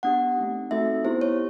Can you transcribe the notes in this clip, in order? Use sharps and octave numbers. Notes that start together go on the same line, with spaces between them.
B3 D4 G4 F#5
A3 C4 D#4
A3 C4 D#4 F#4 A4 E5
B3 E4 G4 C5
C#5